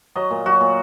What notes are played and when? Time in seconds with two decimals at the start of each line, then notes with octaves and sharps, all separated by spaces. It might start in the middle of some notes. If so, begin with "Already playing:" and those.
0.15 F#3 D#5
0.31 A#2
0.46 F#3 F#4
0.61 A#2